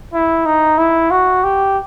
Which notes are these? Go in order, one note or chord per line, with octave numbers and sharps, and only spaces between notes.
E4
D#4
E4
F#4
G4